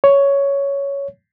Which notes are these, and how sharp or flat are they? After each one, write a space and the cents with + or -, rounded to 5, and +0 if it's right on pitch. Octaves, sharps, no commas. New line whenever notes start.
C#5 +10